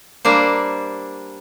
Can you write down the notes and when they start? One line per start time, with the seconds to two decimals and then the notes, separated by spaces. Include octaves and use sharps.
0.25 G3 A#3 D4 C5